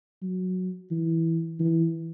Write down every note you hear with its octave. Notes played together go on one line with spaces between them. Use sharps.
F#3
E3
E3